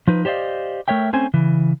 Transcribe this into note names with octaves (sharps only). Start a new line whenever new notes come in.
F3 D#4 B4
G4 C5 D5 D#5 F5
A3 A#4 C#5 E5 G5
A3 C4 C#4 C5 G#5
C#3 E3